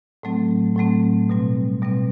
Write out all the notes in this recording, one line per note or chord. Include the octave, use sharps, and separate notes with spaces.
A2 F#3 A3 C4
A2 F#3 A3 C4
B2 G3 C4
B2 G3 C4